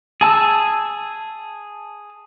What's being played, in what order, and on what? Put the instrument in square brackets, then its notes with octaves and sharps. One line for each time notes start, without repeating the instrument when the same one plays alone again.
[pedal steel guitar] G#4 A5 E6